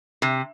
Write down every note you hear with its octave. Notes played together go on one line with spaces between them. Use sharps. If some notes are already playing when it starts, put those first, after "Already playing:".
C3